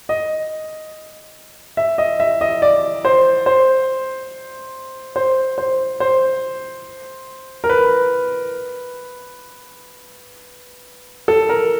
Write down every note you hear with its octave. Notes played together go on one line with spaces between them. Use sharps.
D#5
E5
D#5
E5
D#5
D5
C5
C5
C5
C5
C5
A#4
B4
A4
A#4